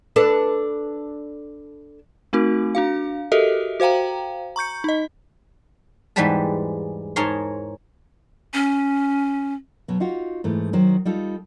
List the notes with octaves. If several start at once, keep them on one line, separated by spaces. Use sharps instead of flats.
D4 A4 B4
A3 C4 D#4 F#4 A#4
D4 F#4 F5
F#4 G4 A4 A#4 D#5 E5
F#4 C5 F5 G5 A#5
A#5 C#6 G6 C#7
D#4 D#5
E2 G#2 G3 G#3 B4 A5
G#2 G#4 A#4 C#5 A5 C6
C#4
B2 F#3
D#4 F4 F#4
G#2 E3 A3
D#3 F#3 C5
G3 D#4 F4 A4